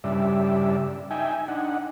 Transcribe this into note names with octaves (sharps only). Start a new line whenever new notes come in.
G2 C#3 G3 D5 E5
D#4 E5 G5 G#5
D4 D#4 F#5